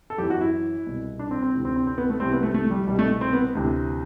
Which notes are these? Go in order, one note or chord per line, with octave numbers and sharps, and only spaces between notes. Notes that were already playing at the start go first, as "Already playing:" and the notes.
A4
F#2 E3 G4
F#4
E4
C2 B2
D4
C4
C4
D2 C3 E3
C4
C4
C4
B3
A3
C2 C3 E3 C4
B3
A3
A3
G3
C2 B2 G3
A3
C4
B3
D2 C3 E3